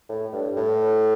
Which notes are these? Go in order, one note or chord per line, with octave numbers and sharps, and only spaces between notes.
A2
G2
A2